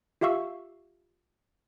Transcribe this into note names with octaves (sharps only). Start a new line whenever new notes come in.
F4 G4 E5 F5 C#6 E6